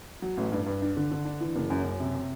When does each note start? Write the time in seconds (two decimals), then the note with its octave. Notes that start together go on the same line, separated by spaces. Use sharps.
0.22 F#3
0.37 A1
0.52 G2
0.66 G2
0.82 D4
0.97 D3
1.11 D3
1.25 D4
1.41 E3
1.56 F#1
1.70 F#2
1.84 F#2
2.00 C3
2.15 C3